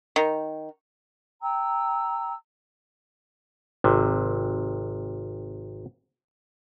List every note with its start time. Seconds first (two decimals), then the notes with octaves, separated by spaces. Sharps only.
0.16 D#3
1.42 G5 A#5 E6
3.84 G#1 C3